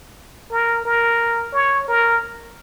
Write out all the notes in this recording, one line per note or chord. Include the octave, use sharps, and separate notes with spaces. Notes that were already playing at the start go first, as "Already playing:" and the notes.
A#4
A#4
C#5
A#4